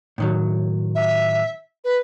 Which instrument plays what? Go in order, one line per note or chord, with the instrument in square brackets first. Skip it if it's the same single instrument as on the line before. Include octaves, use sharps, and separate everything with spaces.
[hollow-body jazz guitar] A2 D#3 F#3
[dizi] E5
B4